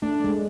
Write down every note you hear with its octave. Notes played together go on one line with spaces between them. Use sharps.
A3 D4
G#3